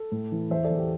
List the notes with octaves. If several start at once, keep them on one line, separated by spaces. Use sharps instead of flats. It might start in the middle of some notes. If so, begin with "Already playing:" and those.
Already playing: A4
A2
E3
E2 C5 E5
A4 D5
E2
G4